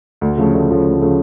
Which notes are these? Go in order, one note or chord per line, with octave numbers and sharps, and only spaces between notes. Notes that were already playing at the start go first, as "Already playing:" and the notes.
D2
C#3 F3 A3
D2
C#3 F3 A3
D2
C#3 F3 A3